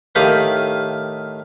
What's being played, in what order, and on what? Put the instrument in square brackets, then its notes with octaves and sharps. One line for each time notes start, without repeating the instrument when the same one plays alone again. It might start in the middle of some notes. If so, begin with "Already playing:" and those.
[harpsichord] A2 D#3 G4 D#5 F5 B5